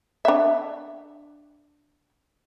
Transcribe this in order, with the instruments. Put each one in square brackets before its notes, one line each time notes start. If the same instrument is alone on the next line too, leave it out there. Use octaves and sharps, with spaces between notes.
[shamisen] D4 E5